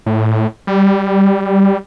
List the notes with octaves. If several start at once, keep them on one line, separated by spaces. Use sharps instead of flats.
A2
G3